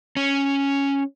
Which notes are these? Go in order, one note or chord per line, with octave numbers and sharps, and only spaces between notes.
C#4